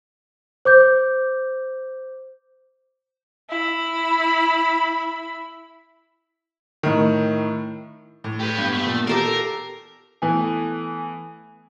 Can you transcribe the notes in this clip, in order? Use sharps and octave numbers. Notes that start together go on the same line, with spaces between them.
C5 D6 G6
E4 B5
A2 D#3
A2
G4 B4 G5
G2 B3
A3
A#2
G4 A4 A#4 F5
E3 A3 B3 G#5